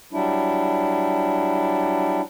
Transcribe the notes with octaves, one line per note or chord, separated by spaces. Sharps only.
F#3 G3 D4 E4